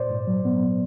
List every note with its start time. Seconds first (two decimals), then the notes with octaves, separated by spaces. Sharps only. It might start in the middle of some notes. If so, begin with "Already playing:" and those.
Already playing: A#2 C5 D5
0.10 G#2
0.27 F#3
0.45 B3